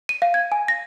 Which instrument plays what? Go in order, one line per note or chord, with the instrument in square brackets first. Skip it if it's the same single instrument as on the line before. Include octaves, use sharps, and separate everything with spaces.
[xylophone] D#7
F5
G#6
G#5
A#6